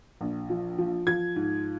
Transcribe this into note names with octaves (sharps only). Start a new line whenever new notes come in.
A#1
F3
F3
F3 G#6
G#2